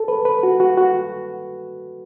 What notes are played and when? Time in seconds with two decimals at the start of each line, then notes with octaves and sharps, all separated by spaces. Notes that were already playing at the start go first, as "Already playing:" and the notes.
Already playing: A4
0.08 B4
0.25 B4
0.43 F#4
0.60 F#4
0.77 F#4